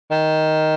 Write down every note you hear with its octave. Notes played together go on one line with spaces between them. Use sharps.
D#3